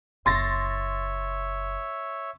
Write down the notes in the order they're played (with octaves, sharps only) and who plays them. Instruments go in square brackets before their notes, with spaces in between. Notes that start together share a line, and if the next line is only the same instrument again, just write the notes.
[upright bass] F#1 [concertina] C#5 E5 [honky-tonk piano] C6 A6 A#6